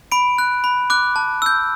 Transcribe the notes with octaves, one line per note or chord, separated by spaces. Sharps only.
B5 D7
F#6
B5
D6 F#6
A5
E6 G6